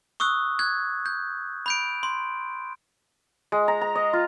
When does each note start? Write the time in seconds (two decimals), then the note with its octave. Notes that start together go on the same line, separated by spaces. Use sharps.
0.20 C#6 D#6 E6 F#6
0.59 F#6 G#6
1.06 G6
1.66 B5 G6 D7
2.03 C6
3.52 G#3
3.68 A#5
3.81 A#5
3.95 D#5
4.13 F4